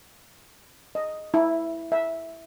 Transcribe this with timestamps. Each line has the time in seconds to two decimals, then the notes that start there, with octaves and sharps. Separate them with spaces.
0.95 D#5
1.34 E4
1.92 E5